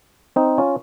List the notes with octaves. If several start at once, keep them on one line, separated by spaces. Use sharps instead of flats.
C4 D#4
C#4 F4